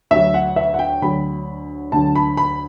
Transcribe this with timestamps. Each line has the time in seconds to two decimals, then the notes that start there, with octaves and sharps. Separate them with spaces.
0.11 D2 D3 F#3 E5
0.34 F#5
0.56 E5
0.74 F#5
0.79 G5
1.02 D2 D3 F#3 B5
1.92 D2 D3 F#3 A5
2.15 B5
2.37 B5